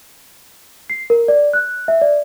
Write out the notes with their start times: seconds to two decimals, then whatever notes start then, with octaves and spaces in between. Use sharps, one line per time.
0.90 C7
1.10 A#4
1.28 D5
1.53 F#6
1.88 E5
2.02 D5